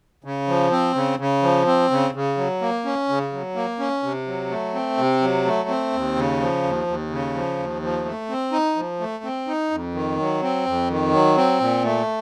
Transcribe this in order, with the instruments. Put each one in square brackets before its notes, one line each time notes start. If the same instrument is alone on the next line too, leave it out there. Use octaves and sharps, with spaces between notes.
[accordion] C#3
F3
C4
C#3
C#3
F3
C4
C#3
C#3
F#3
A#3
C#4
C#3
F#3
A#3
C#4
C3
F#3
A3
C4
C3
F#3
A3
C4
D#2
C#3
F3
D#2
D#2
C#3
F3
D#2
F3
A3
C4
D#4
F3
A3
C4
D#4
F2
D#3
F#3
C4
F2
D#3
F#3
C4
A#2
A3